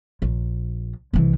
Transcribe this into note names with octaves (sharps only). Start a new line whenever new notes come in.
A#1
C2 E3